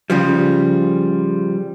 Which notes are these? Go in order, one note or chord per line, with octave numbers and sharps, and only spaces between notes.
C#3 F3 G3